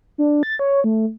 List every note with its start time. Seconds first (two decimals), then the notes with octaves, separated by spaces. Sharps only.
0.18 D4
0.43 A6
0.59 C#5
0.84 A3